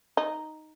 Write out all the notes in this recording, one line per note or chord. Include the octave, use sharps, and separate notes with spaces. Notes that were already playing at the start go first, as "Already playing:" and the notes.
D#4